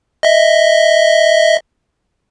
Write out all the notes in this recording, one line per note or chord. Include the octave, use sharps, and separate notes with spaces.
D#5 E5